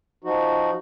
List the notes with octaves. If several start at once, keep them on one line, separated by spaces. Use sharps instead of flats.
F3 D#4 F#4